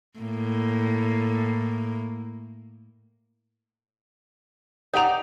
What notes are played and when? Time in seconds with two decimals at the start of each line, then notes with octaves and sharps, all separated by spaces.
0.19 A2 A#3
4.94 D#4 G4 C#5 D5 F#5 A#5 F7